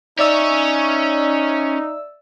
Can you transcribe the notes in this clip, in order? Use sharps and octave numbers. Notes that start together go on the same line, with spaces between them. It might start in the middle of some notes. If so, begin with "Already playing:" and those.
C#4 D#4 C#5 D5 E5 E6